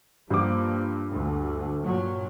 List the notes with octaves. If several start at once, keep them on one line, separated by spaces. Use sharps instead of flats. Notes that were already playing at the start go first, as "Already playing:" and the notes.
G2 F3 G3 A#3 D6
D2
G2 A#2 F#3